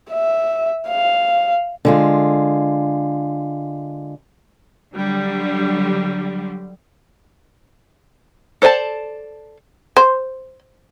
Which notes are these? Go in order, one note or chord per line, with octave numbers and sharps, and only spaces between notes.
E5
F5
D3 G#3 F4
D3 F#3 G3
A4 C5 D5 G#5 A5
C5